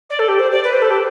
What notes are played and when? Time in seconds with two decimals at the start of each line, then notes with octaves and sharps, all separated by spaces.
0.10 D5
0.19 A4
0.28 G4
0.39 C5
0.51 D5
0.63 B4
0.72 C5
0.82 A4
0.90 G4